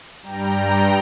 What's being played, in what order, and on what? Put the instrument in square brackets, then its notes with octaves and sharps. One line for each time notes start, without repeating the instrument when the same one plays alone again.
[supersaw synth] G2 G3 G5 A#5